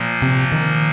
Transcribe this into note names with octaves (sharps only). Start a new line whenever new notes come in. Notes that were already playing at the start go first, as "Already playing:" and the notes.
Already playing: A#2 F3 A#3
C3
D#3